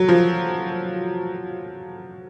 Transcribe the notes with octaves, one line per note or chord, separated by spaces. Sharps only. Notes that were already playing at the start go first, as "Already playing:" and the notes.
Already playing: F#3
F3